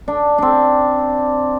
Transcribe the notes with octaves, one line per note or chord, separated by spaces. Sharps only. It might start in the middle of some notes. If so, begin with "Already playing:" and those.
D4
C4 D4